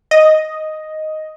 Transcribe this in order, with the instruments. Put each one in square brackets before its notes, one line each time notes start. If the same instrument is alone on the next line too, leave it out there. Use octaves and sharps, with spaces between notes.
[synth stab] D#5